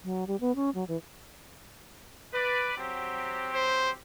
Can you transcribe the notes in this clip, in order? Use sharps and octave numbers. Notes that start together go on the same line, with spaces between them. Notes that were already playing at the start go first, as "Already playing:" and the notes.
F#3
G3
B3
C#4
F#3
E3
B4 D5
F#3 C4 G4
C5